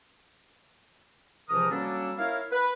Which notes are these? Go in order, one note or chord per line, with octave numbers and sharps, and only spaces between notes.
C#2 C3 E3 F3 A#4 D#6
F#3 G3 A#3 C#4 D4 A4
E4 A#4 C#5 F5
B4